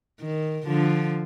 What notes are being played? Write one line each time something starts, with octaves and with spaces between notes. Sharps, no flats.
D#3
D3 F3